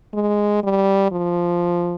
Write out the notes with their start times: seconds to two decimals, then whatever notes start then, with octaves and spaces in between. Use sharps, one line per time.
0.14 G#3
0.63 G3
1.12 F3